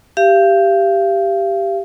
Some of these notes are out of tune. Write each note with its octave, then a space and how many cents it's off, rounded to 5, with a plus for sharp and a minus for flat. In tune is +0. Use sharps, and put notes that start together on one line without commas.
G4 +0 F5 -35